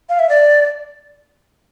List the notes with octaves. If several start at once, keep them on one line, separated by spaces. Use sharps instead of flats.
F5
E5
D5